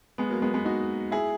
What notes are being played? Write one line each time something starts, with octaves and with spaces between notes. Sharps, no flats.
G#3 B3
F#3 A#3
G#3 B3
G#3 B3
D#4 F#4
E4 G#4